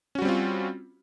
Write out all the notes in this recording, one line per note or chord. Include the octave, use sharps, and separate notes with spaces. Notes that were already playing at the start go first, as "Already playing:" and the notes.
G3 C4 C#4 F4 F#4